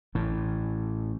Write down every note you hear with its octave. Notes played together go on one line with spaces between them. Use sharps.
A1 A2